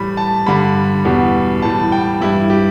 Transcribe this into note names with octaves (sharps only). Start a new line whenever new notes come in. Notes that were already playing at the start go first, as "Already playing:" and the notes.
Already playing: A2 E3 G3 B5
A5
G2 D3 G3 B5
E2 B2 G3
A2 E3 G3 A5
G5
G2 E3 G3 E4
G4